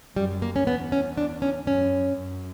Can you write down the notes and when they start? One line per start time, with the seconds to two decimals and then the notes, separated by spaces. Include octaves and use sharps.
0.16 F#2 G3
0.42 A#3
0.56 C#4
0.66 E2 B3
0.92 C#4
1.17 D4
1.42 C#4
1.67 F#2 C#4
2.17 F#2